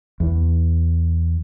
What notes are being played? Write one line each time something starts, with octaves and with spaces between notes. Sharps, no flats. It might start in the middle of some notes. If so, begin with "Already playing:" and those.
E2